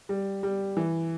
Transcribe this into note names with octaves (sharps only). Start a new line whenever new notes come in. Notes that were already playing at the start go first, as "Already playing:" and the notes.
G3
G3
E3